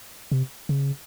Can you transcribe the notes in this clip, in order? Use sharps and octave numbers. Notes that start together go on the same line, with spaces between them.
C3
C#3